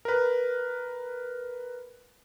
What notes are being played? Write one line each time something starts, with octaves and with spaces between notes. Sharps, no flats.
A#4 B4